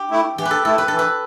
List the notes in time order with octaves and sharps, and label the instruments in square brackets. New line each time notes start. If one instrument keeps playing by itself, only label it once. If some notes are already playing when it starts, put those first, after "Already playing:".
Already playing: [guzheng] G4
[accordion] A3 E4
[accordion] E3 [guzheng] G4
[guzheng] B4
A4
[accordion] A3 E4 [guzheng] A4
[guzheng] B4
[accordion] E3 [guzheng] A4
[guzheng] B4